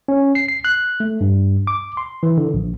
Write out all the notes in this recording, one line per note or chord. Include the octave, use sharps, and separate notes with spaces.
C#4
C7
C7
F#6
A3
G2
D6
C6
E3
D3
A#1